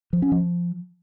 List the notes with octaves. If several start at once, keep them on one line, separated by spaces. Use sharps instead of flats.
F3
C#4
F3